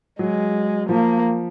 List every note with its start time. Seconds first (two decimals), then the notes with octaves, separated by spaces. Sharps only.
0.19 F#3 G#3
0.89 F3 A#3